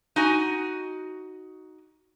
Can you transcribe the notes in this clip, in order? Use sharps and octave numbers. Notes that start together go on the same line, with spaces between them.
D#4 F#4 G#5